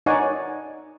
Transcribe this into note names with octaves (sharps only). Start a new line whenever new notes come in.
D#4 C#5 D5 F#5 G#5